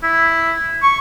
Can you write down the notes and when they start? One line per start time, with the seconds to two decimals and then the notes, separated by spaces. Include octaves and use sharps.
0.03 E4
0.83 C#6